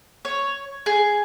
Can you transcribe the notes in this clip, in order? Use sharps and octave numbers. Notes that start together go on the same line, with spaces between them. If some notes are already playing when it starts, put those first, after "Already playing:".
C#5
G#4